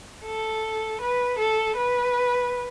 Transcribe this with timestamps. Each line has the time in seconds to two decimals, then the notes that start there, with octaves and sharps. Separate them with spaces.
0.25 A4
1.01 B4
1.39 A4
1.77 B4